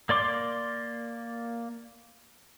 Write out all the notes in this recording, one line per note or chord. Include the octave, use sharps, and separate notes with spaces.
A#3 D5 C6 D6